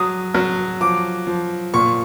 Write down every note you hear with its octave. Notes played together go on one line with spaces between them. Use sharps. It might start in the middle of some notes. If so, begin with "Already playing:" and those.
Already playing: F#3 D#6
F#3
F3 D6
F3
A#2 C#6